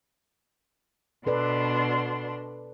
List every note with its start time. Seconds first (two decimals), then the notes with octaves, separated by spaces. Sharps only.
1.27 B2 D4 A4 B4 D5 C6